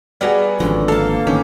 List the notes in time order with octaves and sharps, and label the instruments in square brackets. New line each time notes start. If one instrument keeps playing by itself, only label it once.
[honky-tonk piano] G3 F#4 G#4 [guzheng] B3 D5 A#5
[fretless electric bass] G#1 F3 [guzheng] D3 [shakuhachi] C#4
[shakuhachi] A#3 [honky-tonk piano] A4 [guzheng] F5 A5
[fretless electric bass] A1 D#3 [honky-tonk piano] C#4 [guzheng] G4